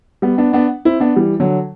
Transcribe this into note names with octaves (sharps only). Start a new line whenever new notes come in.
G3 B3
B3 D4
B3 D4
C4 E4
B3 D4
E3 G3
D3 F#3